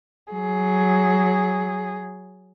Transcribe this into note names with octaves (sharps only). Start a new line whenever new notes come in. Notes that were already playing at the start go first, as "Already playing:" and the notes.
F#3 G#4